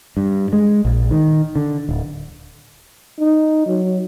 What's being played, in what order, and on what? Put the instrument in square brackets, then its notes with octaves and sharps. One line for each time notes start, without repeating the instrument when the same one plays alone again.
[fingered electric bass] G2
G#3
A#1
D#3
D3
D1
[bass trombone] D#4
F#3